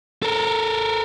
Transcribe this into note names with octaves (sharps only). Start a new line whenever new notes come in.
A4 A#4